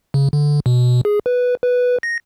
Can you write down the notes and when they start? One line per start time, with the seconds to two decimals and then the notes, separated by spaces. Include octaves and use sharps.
0.14 C#3
0.33 D3
0.66 B2
1.05 G#4
1.26 B4
1.63 B4
2.03 A#6